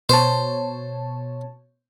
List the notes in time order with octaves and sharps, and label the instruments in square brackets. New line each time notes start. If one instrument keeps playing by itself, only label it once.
[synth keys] B2 C#5 A5 [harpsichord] C5